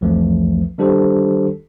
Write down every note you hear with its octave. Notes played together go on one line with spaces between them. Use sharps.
C2 F2 E3 F3 A3
D#3 G3 D4 G4 A4 C5